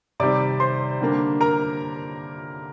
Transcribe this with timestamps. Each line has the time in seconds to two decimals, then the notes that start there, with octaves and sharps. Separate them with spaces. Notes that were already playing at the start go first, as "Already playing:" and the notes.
0.20 C3 D#3 G3 C4 D5 D6
0.60 C5 C6
1.01 D3 G3 A#3 D4
1.41 A#4 A#5